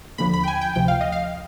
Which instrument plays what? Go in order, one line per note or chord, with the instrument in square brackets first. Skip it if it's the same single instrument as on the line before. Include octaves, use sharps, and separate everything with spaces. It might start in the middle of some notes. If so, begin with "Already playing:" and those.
[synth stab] D#2 D3 F3 B5
B5
G5
G#5
G5
D2 C3 F3 G5
F5
D#5
F5